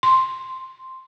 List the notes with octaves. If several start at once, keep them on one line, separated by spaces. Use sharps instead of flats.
C6